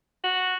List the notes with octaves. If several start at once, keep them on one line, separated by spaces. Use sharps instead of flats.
F#4